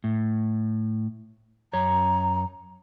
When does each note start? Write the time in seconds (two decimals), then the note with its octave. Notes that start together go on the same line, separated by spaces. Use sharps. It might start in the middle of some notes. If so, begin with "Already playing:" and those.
0.04 A2
1.73 F#2 C#5 A#5